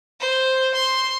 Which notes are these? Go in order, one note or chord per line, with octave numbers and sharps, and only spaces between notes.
C5
C6